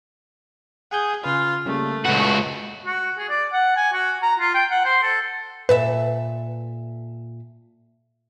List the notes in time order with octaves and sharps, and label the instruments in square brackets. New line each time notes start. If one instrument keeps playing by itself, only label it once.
[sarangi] G#4 [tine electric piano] F#5 G#5 G6
[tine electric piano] C#3 B4 [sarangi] F4
[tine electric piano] C#3 G3 A#3 [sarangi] A3
[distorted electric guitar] C#2 F#4 [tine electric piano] B4 F#5
[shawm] F#4
G#4
D5
F#5
G#5
F#4
A#5
F4
G5
F#5
C5
A4
[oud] A#2 A4 E5 [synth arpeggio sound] B4